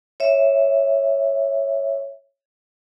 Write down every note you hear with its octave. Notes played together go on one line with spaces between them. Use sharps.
C#5 E5